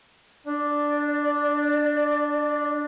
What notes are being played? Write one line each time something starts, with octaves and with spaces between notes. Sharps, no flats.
D4 D5